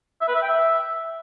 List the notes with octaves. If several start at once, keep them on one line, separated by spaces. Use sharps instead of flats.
E5
B4
E5
G5
E5